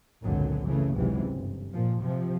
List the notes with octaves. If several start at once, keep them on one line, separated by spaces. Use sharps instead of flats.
G#1 C#2 F#2 A#2 D3 F#3
C#3 E3 A3
G#1 C#2 G#2 C3 E3 F#3
G1
A#2 F3
C3 F3